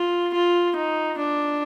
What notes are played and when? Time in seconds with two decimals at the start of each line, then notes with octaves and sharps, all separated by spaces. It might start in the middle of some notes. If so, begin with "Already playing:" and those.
Already playing: F4
0.34 F4
0.76 D#4
1.18 D4